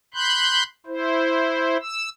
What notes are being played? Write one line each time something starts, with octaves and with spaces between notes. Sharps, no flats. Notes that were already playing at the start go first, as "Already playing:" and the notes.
B5 C6 F#6 G6
E4 C5
E6